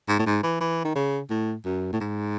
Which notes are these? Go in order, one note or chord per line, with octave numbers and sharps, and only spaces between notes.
G#2
A2
G#2
E3
E3
D#3
C#3
A2
F#2
A2
G#2